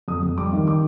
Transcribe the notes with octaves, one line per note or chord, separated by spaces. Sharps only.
F2 D#6
F2
G3 D6
D#3
D6